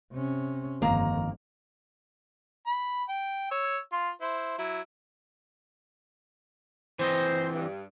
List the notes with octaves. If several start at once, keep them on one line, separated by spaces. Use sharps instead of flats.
C3 C#4
G1 F2 D#3 A#3 A#5
B5
G5
C#5 E6
F4 C6
E4 C5
F#3 E4
E3 C4 C5 D#5
G2